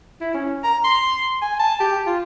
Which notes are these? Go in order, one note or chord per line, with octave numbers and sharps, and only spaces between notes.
E4
C#4
A#5
C6
G#5
A5
G4
F4